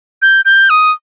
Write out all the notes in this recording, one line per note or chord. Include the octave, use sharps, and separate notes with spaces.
G6
G6
D#6